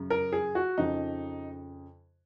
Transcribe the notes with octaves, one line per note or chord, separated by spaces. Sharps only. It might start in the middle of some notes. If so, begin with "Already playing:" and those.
Already playing: F#2 C#3
A#4
G#4
F#4
F2 C#3 D#4